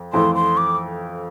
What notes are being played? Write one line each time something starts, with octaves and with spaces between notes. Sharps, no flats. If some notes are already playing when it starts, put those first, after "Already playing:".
Already playing: F2
F2 E3 A3 C6
C6
D6